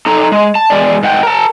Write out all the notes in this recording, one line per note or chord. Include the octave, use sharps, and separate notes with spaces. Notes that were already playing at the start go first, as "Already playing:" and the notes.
D#4 A4 A#5
G#3
A5
E2 F3 G#3 D5
G#2 F#5 G5
A#4 A5